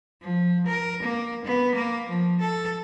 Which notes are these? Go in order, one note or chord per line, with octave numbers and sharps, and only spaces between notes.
F3
A#4
A#3
B3
A#3
F3
A4